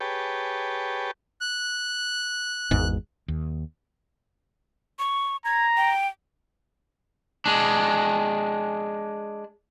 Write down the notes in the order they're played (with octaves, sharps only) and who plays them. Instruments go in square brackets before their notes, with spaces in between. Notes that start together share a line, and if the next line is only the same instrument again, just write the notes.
[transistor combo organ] G4 G#4 B4 C#5 G5 A5
[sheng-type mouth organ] F#6
[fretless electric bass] G#1 E2 G#2
D#2
[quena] C#6
[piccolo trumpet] A#5 [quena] G#6
[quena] G5
[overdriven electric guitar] G#3 D4